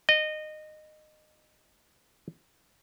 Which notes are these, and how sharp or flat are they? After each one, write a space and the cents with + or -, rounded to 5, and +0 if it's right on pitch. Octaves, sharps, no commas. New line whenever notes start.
D#5 -20